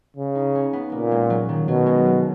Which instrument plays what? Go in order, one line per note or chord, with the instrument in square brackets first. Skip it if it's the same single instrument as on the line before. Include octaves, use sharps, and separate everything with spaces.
[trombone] C#3
[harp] D#4
C#4
B3
[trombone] A#2 [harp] A#3
[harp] G#3
F#3
D#3
[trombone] B2 [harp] F#3
[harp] G#3
F#3